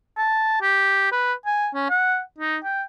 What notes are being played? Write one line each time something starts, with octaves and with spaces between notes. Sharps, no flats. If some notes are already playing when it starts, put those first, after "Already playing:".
A5
G4
B4
G#5
C#4
F#5
D#4
G5